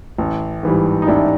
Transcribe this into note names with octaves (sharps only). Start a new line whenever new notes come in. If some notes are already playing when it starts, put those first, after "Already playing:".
A1
G#2 E3 G3
D#4
A1 D4 E4